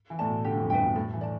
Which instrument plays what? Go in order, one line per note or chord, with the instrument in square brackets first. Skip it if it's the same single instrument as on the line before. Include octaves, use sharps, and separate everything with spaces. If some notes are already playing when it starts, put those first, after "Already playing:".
[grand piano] E3
[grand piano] A2 [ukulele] D5 A5
[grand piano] B2
[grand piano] D3 [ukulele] G4
[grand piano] F2
[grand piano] G2 [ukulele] B4 E5 G5
[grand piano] B2
[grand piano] A2 [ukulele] A4
[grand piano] E3
[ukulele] D5 A5